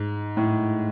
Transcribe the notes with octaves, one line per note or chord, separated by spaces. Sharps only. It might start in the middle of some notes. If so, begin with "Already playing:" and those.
Already playing: G#2
A2